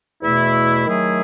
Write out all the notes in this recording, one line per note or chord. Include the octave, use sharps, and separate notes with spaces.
E2 B2 A3 E4
D#3 F#3 A3 E4 G#4